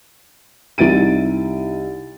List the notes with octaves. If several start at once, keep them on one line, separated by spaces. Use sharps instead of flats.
C2 D#4 E4 A6 D7 D#7